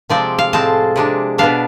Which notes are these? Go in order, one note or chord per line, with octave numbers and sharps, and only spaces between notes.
C3 F3 G#3 C4 D5
F5
A2 G#3 C4 A5
C3 G#3 D4
B2 B3 D4 F5